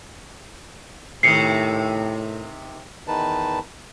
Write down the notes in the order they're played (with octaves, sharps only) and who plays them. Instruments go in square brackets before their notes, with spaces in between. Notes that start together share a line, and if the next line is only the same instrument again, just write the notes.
[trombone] A2 [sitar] C3 D#3 [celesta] C7 C#7
[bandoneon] E2 D#3 D#4 B4 A5